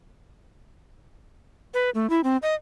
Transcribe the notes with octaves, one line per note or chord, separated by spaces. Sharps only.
B4
A3
E4
C4
D#5